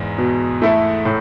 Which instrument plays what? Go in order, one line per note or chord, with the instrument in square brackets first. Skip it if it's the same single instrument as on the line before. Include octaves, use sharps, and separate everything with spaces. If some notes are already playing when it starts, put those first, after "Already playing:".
Already playing: [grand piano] E2 G#2
[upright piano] B2
A3 E4 A4
A2